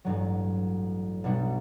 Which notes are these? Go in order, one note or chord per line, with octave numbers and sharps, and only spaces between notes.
A1 G2 F#3
B1 B2 G3 D4 F#4